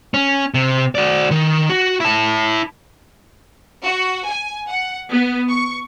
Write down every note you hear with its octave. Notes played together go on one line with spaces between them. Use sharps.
C#4
C3
F#4 D5
D#3
F#4
E4 A5
F#4
G#5
F#5
B3
C#6